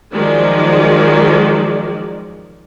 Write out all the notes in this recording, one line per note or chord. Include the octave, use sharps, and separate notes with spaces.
D#3 F3 F#3 G#3 D5